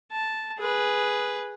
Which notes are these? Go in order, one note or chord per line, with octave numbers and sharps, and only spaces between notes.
A5
G#4 B4